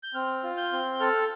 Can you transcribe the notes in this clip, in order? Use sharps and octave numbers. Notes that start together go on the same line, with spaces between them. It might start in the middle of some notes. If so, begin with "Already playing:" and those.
G6
C4 F6
F4
G6
C4
A4 F6